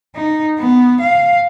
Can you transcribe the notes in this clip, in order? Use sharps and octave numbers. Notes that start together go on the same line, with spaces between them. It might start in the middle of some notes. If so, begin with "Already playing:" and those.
D#4
B3
F5